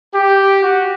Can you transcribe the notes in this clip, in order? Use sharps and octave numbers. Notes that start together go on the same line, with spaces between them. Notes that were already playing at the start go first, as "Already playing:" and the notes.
G4
F#4